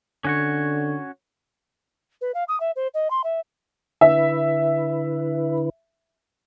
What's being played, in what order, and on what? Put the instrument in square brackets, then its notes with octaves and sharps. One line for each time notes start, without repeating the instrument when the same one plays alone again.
[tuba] D3 [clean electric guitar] C#4 F#4 C#5
[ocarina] B4
F5
D#6
E5
C5
D#5
C6
E5
[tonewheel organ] D3 E4 B4 [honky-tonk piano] E5